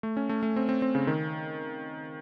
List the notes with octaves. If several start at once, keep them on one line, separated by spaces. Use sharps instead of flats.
A3
C#4
A3
A3
C4
C4
C4
C#3
D#3